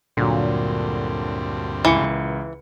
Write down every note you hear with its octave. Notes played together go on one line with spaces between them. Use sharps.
D2 G2 A#2 D3 F#3 C4
C#2 E3 C#7